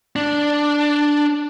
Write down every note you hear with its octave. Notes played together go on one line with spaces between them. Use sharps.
D4